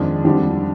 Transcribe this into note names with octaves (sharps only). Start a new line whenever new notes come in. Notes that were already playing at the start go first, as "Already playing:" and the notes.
Already playing: F2 D#3 G#3 D4
F2 D3 G3 D4 G4